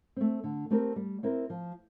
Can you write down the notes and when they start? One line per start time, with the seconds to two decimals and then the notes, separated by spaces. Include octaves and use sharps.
0.16 A3 C4
0.44 D3
0.71 A3 C4 G4 A#4
0.96 G3
1.23 C4 E4 A#4
1.50 F3